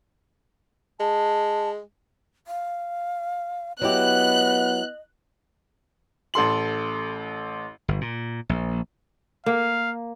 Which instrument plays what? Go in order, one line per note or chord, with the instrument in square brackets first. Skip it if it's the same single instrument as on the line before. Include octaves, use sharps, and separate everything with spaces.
[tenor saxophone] G#3 [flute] A5
[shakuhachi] F5
[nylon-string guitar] F#3 E4 G4 [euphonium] B3 [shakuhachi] D#5 [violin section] F#6
[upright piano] A1 A4 C6 F#7
[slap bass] G1
A#2
A#1
[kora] A#3 [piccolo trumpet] F5